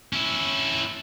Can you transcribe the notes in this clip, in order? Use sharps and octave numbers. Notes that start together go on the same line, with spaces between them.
C#4 E4